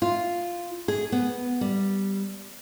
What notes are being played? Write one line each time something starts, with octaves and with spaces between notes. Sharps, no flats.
F4
G#4
B3
G3